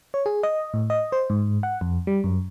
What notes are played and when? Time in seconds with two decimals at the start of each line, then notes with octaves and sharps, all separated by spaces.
0.14 C#5
0.26 G#4
0.43 D#5
0.74 A2
0.90 D#5
1.12 C5
1.30 G#2
1.63 F#5
1.81 F2
2.07 G3
2.24 F#2